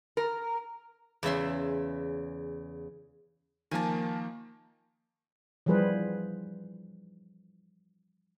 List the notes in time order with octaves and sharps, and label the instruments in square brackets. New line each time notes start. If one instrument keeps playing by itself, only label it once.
[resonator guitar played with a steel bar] A#4
[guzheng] E2 C#3 E5 C6
[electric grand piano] D#3 F3 A#3 [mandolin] G#5 A5
[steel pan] E3 F3 G3 G#4 B4 C5